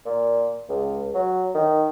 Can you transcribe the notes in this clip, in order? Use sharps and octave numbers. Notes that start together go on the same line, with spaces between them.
A#2
C#2
F#3
D#3